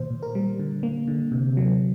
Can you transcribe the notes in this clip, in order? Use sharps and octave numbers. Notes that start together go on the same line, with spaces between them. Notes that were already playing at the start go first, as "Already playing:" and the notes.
Already playing: A#2 D#3 C5
A#2
A#4
G3
D3
A#3
D3
C3
F#3